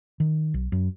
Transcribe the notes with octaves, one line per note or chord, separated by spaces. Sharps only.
D#3
B1
F#2